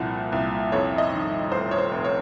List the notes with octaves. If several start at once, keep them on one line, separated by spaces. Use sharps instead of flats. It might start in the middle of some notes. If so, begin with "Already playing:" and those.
Already playing: C2 A#2 F3 F#4
C2
F2 C#5
D#5
D#3
F1 C5
C#5
C5
F1
C#5